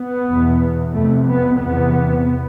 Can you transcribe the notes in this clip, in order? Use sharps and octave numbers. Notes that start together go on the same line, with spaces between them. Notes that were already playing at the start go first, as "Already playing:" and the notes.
Already playing: B3
E2 B2
F2 C3 A3
B3
E2 C3 B3